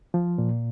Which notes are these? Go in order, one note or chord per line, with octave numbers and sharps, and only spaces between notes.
F3
A#2